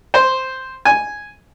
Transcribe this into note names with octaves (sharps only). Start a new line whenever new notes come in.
C5
G#5